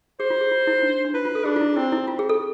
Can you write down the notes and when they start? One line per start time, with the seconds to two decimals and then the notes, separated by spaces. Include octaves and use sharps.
0.20 G#4 C5
0.30 F4
0.41 G#4
0.51 F4
0.67 E4
0.83 D4
1.05 D4
1.14 E4 B4
1.25 F4
1.35 A4
1.45 D4 G#4
1.56 F4
1.61 E4
1.77 C4 E4
1.92 E4
2.08 C4 F4
2.19 G#4
2.29 A4